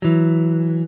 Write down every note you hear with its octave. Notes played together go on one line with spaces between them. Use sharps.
E3 F#3